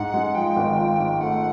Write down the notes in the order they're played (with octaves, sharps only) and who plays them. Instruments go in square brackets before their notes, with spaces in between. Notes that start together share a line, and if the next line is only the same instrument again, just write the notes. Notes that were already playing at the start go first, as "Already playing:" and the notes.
Already playing: [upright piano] G#2 [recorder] F#5
[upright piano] G#3
[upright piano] F3 [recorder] G5
[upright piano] G#1
F3
G#2
[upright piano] A3 [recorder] F#5